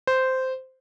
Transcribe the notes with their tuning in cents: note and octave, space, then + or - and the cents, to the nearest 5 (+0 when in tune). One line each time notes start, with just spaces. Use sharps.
C5 -10